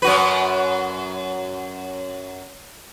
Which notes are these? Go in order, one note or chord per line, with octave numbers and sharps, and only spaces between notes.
F#2 F#4 B4